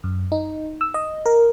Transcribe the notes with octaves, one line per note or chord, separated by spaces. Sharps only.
F#2
D#4
E6
D#5
A#4